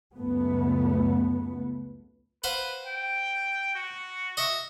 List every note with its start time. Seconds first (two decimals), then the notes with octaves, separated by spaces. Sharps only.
0.14 C#2 F#2 A3 B3
2.44 B4 C5 F5 F#5
2.86 G5
3.75 F#4
4.37 D#5 E5 C#6